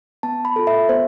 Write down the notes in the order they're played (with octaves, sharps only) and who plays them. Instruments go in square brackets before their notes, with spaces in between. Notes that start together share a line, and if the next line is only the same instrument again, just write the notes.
[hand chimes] B3 A5
B5
F4 A4
E5
B3 C5